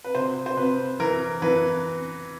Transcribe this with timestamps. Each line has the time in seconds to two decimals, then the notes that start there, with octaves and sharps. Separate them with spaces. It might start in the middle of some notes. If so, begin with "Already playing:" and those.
0.04 B4
0.15 C3 C5
0.46 C5
0.57 C3 B4
1.00 E3 A#4
1.42 E3 B4